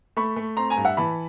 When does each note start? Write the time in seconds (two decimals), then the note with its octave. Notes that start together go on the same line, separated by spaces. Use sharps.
0.17 A3 B5 C#6
0.36 A3
0.57 C4 A#5 C6
0.70 G#5 A#5
0.77 G2
0.85 E5 F#5
0.97 E3 A5 B5